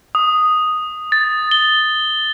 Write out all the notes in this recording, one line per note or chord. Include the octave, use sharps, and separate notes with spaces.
D#6
A6
G7